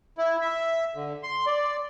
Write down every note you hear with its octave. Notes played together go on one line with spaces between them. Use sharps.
E4
E5
D3
C6
D5